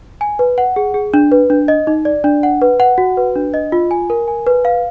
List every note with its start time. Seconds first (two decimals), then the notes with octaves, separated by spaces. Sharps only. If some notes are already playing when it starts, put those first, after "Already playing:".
0.21 G#5
0.39 B4
0.58 F#5
0.76 G#4
0.94 G#4
1.14 D4
1.32 B4
1.50 D4
1.68 D#5
1.87 D#4
2.05 D5
2.24 D4
2.43 F#5
2.62 B4
2.80 F#5
2.98 F#4
3.17 B4
3.36 D4
3.54 D#5
3.72 F4
3.91 G#5
4.10 A#4
4.28 G#5
4.47 B4
4.65 F5